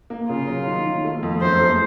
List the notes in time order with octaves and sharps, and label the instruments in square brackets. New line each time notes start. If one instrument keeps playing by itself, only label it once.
[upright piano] A#3
[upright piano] C#3 [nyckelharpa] F4
[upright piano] F#3
D#3
D#3
A3
F2
[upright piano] F#2 [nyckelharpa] C5
[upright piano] A3